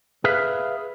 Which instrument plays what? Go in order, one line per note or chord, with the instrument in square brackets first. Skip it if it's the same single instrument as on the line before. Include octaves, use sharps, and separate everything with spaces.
[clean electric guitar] G#4 B4 E5 F5